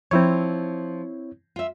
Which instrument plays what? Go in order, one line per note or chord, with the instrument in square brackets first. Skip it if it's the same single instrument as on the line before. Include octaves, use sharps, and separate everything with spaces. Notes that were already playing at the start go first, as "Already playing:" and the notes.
[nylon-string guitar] F3 [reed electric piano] C4 E4 C#5
[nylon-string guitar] F4 E5